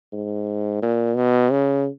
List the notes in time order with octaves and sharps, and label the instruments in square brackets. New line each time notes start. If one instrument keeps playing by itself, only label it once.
[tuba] G#2
A#2
B2
C#3